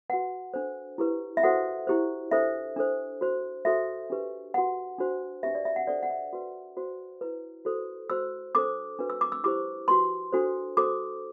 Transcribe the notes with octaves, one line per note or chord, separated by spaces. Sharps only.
F#4 B4 F#5
D4 A4 C5
E4 G4 B4
E5
F#4 A4 C5 F#5
E4 G4 C5
D4 A4 C5 E5
D4 A4 C5
F#4 C5
F#4 A4 C5 E5
D4 G4 B4
F#4 B4 F#5
D4 F#4 C5
D4 G4 B4 E5
D5
E5
F#5
D4 A4 C5 D5
F#5
E5
F#4 B4
F#4 C5
E4 B4
F#4 A4 C5
F#4 C5 E6
D4 A4 C5 D6
D4 F#4 B4
E6
D6
E6
E4 G4 C5 D6
F#4 B4 C6
D4 F#4 A4 C5
F#4 A4 C5 D6